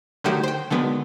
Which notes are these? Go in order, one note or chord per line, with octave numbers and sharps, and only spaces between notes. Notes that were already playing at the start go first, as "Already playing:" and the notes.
D3 D#3 F#3 A3 F#4 G4
C5 G5
D3 D#3 F#3 G#3 B3